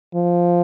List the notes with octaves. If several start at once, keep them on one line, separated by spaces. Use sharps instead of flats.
F3